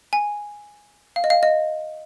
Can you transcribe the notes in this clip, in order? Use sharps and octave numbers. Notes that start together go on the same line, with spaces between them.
G#5
F5
D#5
F5
D#5